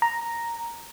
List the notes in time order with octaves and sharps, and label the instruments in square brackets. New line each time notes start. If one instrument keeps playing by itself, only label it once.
[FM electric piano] A#5